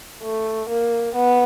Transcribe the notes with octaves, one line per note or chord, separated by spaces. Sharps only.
A3
A#3
B3